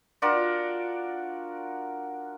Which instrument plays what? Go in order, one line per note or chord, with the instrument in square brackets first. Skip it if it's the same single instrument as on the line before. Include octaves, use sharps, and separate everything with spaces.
[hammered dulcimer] D4 F4 F#4 A#4